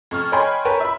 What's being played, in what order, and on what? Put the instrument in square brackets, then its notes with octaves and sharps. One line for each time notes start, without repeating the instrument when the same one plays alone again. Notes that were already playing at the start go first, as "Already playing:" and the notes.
[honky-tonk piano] F2 C#6 F6
C#5 D#5 G5 G#5 B5 C6
A#4 B4 C#5 G5 A5
E5 B5